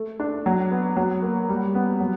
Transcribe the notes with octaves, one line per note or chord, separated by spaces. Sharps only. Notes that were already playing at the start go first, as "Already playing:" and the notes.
Already playing: A3
D4
F#3
B3
F#3
A#3
G3
B3
F#3